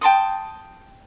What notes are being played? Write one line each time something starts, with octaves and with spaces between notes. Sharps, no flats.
G5 A5 C6 D#6